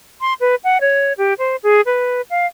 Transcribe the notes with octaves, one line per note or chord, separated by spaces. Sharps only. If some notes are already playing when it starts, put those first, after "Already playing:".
C6
B4
F#5
C#5
G4
C5
G#4
B4
F5